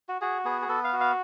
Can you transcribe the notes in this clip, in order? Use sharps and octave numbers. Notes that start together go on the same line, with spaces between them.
F#4
F#4 G#4
B3 G#4
G#4
B3 A4
F5
F#4
F5